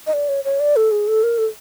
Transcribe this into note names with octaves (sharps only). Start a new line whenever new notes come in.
D#5
D5
C#5
C#5
D5
A4
G#4
A4
A#4
A4